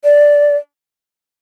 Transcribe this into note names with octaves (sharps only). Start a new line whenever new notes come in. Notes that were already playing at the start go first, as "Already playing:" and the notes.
D5